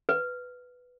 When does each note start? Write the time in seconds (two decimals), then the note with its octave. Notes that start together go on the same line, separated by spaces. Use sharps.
0.09 B4